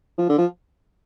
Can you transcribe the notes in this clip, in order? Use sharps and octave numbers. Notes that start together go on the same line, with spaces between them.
F3
D3
F3